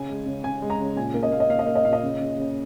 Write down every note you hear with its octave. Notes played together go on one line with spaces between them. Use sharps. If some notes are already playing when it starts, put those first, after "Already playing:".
Already playing: C#3 G#5
G#3
C#3
C#3 G#5
G#3
A#5
C#3
A#2 G#5
A#3
D#5
A#3 F5
D#5
A#3 F5
D#5
A#3 F5
D#5
A#2 F5
D#5
C#3
C#3
C#3